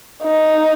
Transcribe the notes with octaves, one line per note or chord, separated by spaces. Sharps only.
D#4